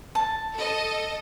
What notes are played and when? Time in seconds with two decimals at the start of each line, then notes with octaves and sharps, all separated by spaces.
0.15 A5
0.56 A4 D#5